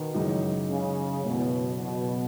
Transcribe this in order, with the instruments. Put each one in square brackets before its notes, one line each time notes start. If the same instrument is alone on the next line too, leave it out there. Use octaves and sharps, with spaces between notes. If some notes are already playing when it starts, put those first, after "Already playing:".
Already playing: [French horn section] B2 D#3
[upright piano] F#2 C#3 E3 G#3 D#4
[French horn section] C#3
[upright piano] F#1 F#2 E3 B3 [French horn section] B2
[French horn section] B2